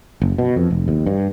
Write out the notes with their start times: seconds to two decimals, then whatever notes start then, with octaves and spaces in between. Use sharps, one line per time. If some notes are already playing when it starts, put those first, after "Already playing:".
0.22 F#1
0.38 B2
0.56 F2
0.71 F1
0.88 D#2
1.06 G2